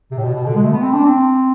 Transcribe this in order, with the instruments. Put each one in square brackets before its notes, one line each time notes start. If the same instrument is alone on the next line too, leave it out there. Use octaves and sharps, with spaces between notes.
[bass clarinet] C3
A2
B2
B2
D3
G#3
A3
B3
C4
D4
C4